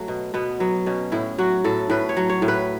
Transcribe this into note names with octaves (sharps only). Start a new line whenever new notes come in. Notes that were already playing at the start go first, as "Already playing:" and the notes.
Already playing: F#3 A3
B2
B2 B3
F#3 B3
B2 C#4
A2 E4
F#3 F#4
A2 A4
A2 B4
C#5
F#3
C#5
A2
B4